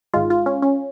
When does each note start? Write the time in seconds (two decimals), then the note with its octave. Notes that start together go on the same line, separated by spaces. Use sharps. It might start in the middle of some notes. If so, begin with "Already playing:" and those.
0.14 G#1 G#2 G#3 F4
0.30 F4
0.46 C#4
0.62 C#4